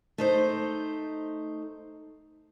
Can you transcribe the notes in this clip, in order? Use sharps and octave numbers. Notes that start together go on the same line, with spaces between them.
A3 D#4 C5